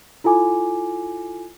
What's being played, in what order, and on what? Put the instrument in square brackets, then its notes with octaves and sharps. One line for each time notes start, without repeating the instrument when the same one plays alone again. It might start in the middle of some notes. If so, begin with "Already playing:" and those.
[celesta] E4 F4 A4 G#5 D6